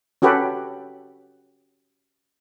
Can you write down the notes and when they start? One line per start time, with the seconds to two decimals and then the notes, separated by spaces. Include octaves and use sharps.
0.22 C#4 F#4 G4 A4 B4